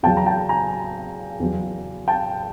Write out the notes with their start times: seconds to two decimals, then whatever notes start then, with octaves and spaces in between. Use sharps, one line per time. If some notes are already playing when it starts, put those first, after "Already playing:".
0.03 E2 C#3 F#3 G5 A5
0.17 A#5
0.26 G5 A5
0.49 G#5 A#5
1.40 E2 C#3 F#3
2.08 G5 A5